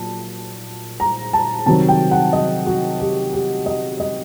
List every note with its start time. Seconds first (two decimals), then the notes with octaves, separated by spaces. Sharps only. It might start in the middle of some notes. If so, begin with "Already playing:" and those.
Already playing: A#2 F#3 A5
1.00 A#5
1.33 A5
1.66 C3 D#3 F#3 A5
1.88 G5
2.11 F#5
2.33 D#5
2.66 F#4
3.00 G4
3.33 G4
3.66 D#5
4.00 D#5